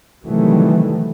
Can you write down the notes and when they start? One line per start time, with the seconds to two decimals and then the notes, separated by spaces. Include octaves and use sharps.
0.24 C3 D#3 E3 F#3 G3 A3